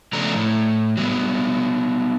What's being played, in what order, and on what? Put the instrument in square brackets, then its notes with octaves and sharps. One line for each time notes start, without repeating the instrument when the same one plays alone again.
[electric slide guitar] C#3 F3 A3 B3 D4 A#5
A2
F#3 G3 B3